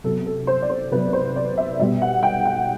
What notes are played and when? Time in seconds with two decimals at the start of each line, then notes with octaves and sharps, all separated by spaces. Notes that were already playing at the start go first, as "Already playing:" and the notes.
0.04 C3 F#3 B3 A4
0.26 A4
0.47 C5
0.62 D5
0.70 C5
0.91 C3 F#3 B3 B4
1.13 C5
1.36 D5
1.57 E5
1.79 B2 G3 B3 E5
2.02 F#5
2.23 G5
2.45 F#5